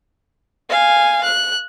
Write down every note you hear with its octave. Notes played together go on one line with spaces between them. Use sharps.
F5 G#5
F#6